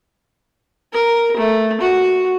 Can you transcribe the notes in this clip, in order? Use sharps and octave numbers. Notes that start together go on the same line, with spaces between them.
A#4
A3
F#4